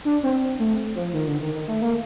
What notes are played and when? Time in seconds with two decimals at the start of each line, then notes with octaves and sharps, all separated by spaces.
0.05 D4
0.23 C4
0.59 A3
0.95 F3
1.13 D#3
1.27 D3
1.41 D#3
1.54 D#3
1.68 A3
1.81 A#3